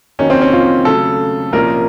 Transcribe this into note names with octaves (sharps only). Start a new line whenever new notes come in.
F2 D#3 A#3 C#4 D#4 F#4
C4
C#4
F4
C#3 F#3 A3 A4
C2 A#2 F3 A#3 C#4 A#4